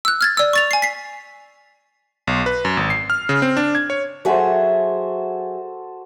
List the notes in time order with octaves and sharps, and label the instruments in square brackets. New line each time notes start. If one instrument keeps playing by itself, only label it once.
[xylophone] E6 F#6
F6 G#6 A6
D5 E6
C#6 A6 F7
G#5 C7
B6 C7
[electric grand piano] B1
B4
F#2
G#1
C7
F6
C#3
C4
D4
G#6
C#5
[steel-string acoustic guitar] F#3 G#4 E5 [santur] F#4 A4 C5